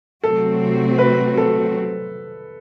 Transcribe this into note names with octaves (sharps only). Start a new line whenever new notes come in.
C3 F#3 A3 C4 F#4 A4
B4
A4